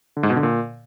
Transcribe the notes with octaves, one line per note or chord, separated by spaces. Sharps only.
D3
G#2
B2
D3
A#2